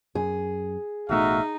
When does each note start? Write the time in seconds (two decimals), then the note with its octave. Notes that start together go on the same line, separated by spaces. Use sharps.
0.15 F#2 G#4
1.09 A1 B2 A3 D#4 F#4 E5 F5